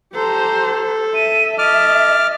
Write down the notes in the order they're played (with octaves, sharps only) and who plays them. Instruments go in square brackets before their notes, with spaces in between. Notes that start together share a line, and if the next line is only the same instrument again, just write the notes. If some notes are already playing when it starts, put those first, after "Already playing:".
[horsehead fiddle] G4 C5 [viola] A4 [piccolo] A#5
[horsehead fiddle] E5 [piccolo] D#7
[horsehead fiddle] D#5 E5 [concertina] D6 F6 [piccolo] A6